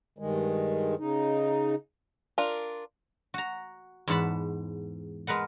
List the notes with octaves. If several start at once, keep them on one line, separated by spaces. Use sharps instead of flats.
G2 D#3 G#3
C#3 D#4
D4 F4 A#4
F#4 A#5
E2 G#2 F#5 A5 B5
G#3 A#4 B4 F#5